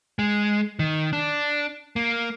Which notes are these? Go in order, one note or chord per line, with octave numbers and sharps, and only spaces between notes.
G#3
D#3
D4
A#3